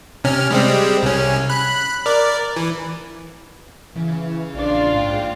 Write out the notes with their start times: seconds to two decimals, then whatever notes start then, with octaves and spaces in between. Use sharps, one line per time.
0.24 C3 C#4 F6
0.50 G3 G#3 C4
1.03 C2 C#4
1.49 B5 F#6
2.06 A#4 D5
2.56 E3
3.95 C#3 E3 C#4
4.54 A#1 D4 F4 D5
4.94 G#2 A#3 G5